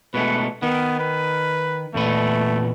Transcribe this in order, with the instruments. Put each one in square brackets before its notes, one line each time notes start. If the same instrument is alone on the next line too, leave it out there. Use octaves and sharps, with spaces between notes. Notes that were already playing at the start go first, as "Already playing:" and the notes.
[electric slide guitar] B2 G#3 A3 [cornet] B4
[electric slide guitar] D#3 [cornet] B3
[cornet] B4
[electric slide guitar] E2 A#2 B4 [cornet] A3